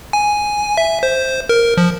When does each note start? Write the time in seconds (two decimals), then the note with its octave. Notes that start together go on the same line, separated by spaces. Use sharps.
0.13 G#5
0.77 E5
1.03 C5
1.49 A#4
1.77 F3